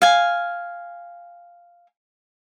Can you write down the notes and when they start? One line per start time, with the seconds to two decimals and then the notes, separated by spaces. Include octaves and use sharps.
0.02 F5 G#5